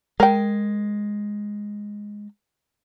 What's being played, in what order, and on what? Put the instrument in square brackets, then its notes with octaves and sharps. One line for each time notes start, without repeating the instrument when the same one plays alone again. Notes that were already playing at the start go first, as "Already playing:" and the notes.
[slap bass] G#3 [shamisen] A#4 G5